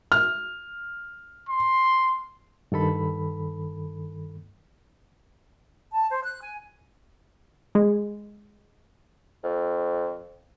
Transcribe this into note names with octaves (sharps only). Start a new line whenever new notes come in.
F6
C6
G2 D#3 A4 B5
A5
C5
F#6
G#5
G#3
F2